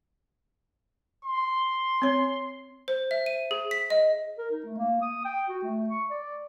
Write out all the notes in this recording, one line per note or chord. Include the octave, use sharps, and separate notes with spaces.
C6
C4 C#5
C5
E5
D#7
G#4
B6
D#5
A#4
D#4
A3
A#3
D#6
G5
F#4
A3
C#6
D5